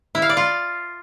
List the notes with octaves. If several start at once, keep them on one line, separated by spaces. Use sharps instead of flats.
E4
F5
D5
F4